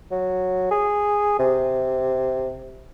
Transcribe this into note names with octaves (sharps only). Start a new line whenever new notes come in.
F#3
G#4
C3